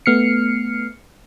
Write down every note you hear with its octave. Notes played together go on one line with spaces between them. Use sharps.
A3 B3 F6 C7 C#7